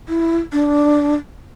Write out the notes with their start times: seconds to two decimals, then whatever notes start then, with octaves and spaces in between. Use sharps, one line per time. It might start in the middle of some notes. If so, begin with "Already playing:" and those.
0.08 E4
0.53 D4